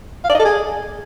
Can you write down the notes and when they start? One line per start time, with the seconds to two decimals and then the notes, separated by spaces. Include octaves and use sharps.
0.24 F5
0.29 D5
0.34 D#5
0.39 A4
0.45 G#4